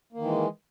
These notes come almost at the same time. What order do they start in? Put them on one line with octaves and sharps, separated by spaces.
A#3 D#3 E3 G#3